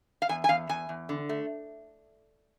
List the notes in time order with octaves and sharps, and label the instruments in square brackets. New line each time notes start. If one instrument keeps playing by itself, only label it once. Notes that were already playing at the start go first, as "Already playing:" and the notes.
[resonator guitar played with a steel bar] F5
E2 G#5
G#5
E2 F5
E2 G#5
E2
D3
A3